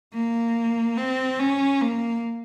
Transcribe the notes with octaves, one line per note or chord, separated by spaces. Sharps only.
A#3
C4
C#4
A#3